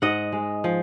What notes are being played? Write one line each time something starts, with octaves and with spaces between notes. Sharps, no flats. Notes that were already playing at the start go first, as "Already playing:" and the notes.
G#2 D#5 F#5
G#3
F3